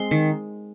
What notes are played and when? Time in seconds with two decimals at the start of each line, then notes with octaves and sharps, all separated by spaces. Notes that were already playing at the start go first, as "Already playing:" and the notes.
Already playing: G#3 C4 C6
0.11 D#3